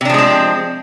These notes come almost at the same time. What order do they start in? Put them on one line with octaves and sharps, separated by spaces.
C3 D4 F3 G#3 C4